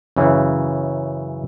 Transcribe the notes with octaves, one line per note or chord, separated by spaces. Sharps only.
F#2 C#3 E3